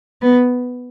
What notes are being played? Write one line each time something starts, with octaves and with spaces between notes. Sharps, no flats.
B3